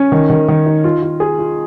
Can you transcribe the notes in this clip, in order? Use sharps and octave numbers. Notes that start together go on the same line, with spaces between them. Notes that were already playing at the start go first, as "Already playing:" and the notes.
Already playing: C#4
D#3
D#3
D#3
D#4
F4
F4
G#4
F4